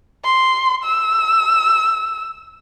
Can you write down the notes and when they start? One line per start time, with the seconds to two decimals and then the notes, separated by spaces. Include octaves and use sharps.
0.25 C6
0.84 E6